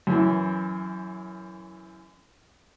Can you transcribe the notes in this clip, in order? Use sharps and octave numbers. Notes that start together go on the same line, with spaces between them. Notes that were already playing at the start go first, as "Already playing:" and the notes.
F#2 E3